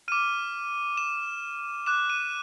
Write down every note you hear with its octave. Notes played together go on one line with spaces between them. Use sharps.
D6 F6 D#7
E7
D6 F#6 E7
D#7